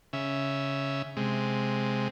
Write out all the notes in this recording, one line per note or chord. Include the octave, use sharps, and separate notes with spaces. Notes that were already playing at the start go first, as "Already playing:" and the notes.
C#3 E5
C3 G#3